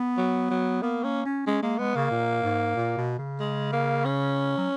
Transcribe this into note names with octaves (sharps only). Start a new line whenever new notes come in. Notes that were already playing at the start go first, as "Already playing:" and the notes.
Already playing: B3
F#3
F#3
A#3 B3
A#3 C#4
C#4
G#3 C#4
G#3 A#3
G#3 B3
C#3 A#3
A#2
G#2
A#2
B2
C#3
G#3
A#3
C#4
F#3